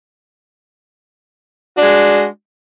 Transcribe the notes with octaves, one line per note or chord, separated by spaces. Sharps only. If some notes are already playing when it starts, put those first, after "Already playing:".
G#3 D4 F#4